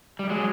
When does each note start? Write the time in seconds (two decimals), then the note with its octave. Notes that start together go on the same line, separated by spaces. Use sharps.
0.19 G3
0.30 F#3 G#3